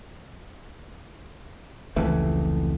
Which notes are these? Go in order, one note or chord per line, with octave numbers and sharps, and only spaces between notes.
F1 C#2 E3 A3